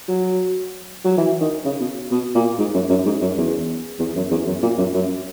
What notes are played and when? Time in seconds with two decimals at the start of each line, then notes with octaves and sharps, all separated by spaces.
0.08 F#3
1.05 F#3
1.18 E3
1.41 D#3
1.65 C#3
1.80 B2
2.11 B2
2.35 A#2
2.58 G#2
2.74 F#2
2.90 F#2
3.06 G#2
3.22 F#2
3.37 E2
3.99 E2
4.16 F#2
4.31 E2
4.46 F#2
4.62 A#2
4.78 F#2
4.94 F#2